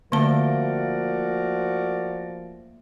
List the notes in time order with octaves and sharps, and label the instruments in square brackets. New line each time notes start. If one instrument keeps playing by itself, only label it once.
[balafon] D3 A5 [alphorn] F3 [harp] A3 A#3 [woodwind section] F#4 A#4 D5